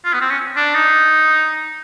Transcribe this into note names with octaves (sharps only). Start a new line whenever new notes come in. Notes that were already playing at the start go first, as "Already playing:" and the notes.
F4
B3
C4
C#4
D4
D#4